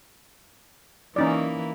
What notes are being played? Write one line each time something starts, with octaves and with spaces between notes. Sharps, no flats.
E3 A#3 C#4 D#4 D5